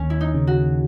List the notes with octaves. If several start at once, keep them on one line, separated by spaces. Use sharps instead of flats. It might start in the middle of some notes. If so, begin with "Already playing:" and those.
Already playing: D#2 C#4
E4
D#4
C#3
F#4